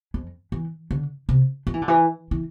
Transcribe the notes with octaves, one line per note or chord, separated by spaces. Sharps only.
F2
E3
D3
C3
F3
E3
D3
E3
E3